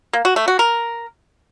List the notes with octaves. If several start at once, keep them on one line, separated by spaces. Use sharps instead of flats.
A#3
F#4
A3
F#4
A#4